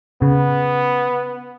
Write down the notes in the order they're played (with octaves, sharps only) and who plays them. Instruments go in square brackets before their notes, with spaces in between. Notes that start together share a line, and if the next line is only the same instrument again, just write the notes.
[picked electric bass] C#3 [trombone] B3